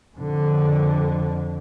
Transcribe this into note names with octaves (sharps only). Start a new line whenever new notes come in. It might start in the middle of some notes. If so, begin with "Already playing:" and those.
F2 D3